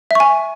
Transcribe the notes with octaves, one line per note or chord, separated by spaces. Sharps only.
E5 G#5 C#6